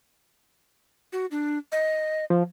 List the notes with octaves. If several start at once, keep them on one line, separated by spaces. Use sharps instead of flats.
F#4
D4
D#5
F3